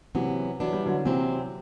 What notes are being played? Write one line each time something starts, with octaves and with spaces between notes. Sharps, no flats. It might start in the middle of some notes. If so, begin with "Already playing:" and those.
C3 E3 F#3 B3 E4
E3 F#3 B3 D4
G3
D3 F#3
C3 E3 F#3 C4 E4